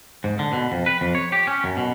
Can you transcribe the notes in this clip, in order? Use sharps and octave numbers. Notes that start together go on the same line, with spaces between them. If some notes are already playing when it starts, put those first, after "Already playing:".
G#2
D3
B2
F2
B4
F2
C#5
G4
C#4
F#2
B2